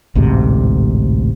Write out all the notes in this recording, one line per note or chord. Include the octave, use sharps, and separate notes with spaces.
A1 D2 G#2 C3